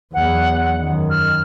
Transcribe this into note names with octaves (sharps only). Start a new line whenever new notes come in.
E2 F#3 F#5
F#2 D#3
F6